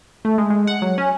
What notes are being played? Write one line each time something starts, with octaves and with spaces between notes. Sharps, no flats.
A3
G#3
G#3
F#5
F#3
C#4